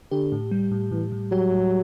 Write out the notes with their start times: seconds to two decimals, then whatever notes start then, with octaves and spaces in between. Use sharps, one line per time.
0.11 D3 G4
0.32 A2
0.51 G3
0.71 A2
0.91 A2 E3
1.12 A2
1.31 F#3 G4
1.52 A2